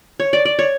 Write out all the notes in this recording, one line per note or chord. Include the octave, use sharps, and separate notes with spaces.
C#5
D5
D5
C#5